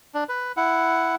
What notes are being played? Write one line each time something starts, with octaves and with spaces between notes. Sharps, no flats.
D4
B4
E4 F#5